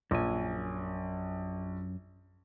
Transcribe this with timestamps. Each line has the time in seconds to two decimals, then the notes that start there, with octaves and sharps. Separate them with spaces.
0.11 A#1 F#2 G#5